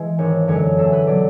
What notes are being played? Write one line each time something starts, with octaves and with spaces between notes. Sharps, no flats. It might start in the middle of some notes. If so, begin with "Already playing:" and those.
Already playing: E3 G#3
G#1 C#5
F#2 D3 G#3 C#5
E2 A4
B4
B2 F#3 D5